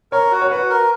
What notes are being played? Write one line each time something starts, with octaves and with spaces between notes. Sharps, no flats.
A#4 C#5
F#4
C#5
F#4 B4
A#4